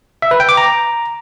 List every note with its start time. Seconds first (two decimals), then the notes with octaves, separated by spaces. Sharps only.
0.22 E5
0.31 B4
0.40 G5
0.49 D6
0.57 A#5